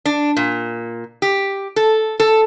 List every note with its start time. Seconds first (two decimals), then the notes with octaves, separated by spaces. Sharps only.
0.05 D4
0.37 A#2
1.22 G4
1.76 A4
2.20 A4